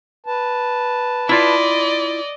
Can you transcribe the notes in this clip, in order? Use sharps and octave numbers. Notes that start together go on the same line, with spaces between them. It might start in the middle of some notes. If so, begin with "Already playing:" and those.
B4 A5
E4 F4 D5 D#5